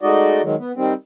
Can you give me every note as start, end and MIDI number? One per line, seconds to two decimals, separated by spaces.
0.01 0.42 56
0.01 0.42 57
0.01 0.42 63
0.01 0.42 66
0.01 0.42 74
0.01 0.42 75
0.43 0.55 51
0.43 0.55 54
0.43 0.55 56
0.58 0.72 59
0.76 0.94 51
0.76 0.94 55
0.76 0.94 60